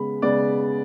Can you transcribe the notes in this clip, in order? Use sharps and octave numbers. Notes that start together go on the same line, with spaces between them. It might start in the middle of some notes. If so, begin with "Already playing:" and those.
Already playing: C#3 G#3 B3 B5
C#3 G#3 B3 D5